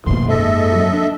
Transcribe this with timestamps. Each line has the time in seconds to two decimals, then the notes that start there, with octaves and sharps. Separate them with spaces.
0.06 B1 F#2 B2 D#3 A#3 C6
0.29 G#2 A4 D#5 E5
0.75 F#3 C#4
0.93 D4